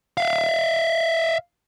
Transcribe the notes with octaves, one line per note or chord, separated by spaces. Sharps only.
E5 F5